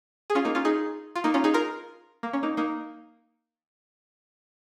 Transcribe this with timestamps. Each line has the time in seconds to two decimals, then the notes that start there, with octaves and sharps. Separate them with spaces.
0.30 G#4
0.35 C#4 F4
0.45 A#3 D#4
0.55 C#4 F4
0.65 D#4 G#4
1.16 F4
1.24 A#3 D#4
1.34 C#4 F4
1.44 D#4 G#4
1.54 F4 A#4
2.23 A#3
2.33 C#4
2.43 A#3 D#4
2.57 A#3 D#4